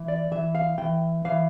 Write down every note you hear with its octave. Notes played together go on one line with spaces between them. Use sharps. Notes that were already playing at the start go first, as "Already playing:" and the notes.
Already playing: E3
D5
E3 E5
F5
E3 G5
E3 F5